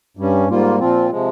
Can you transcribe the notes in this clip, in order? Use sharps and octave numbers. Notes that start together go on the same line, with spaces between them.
G2 G3 C#4
G#2 G3 A#3 F4
A#2 F3 C4 F4
C3 F3 G#3